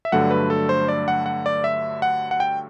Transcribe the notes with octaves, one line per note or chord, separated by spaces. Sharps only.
E5
G2 D3 F#3 A3 F#5
B4
A4
C5
D5
F#5
F#5
D5
E5
F#5
F#5
G5